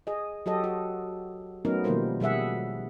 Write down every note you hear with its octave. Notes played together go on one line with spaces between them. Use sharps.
G#4 D#5
F#3 G4 A4 D#5
F#4
F#3 A3 B3 C#4 D#4 A#4
B2 D#3 F3 G3 A#3 C5
B2 G3 G#4 E5 F#5